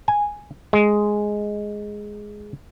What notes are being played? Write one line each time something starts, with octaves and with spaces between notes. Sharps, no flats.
G#5
G#3